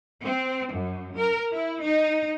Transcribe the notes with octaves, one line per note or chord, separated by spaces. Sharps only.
C4
F#2
A#4
E4
D#4